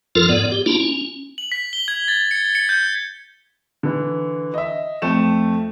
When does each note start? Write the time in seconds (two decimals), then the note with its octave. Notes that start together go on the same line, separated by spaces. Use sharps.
0.15 F2 F3 F4 A4 A#4
0.29 G#2 B3 D5
0.52 G4
0.66 A#3 D4 E4 F4
0.80 C#4
1.38 F#7
1.52 B6
1.73 G7
1.88 G#6
2.08 A6
2.31 C#7
2.55 C#7
2.69 G6
3.83 D3 E3
4.54 D#5 E5
5.02 F2 A3 E7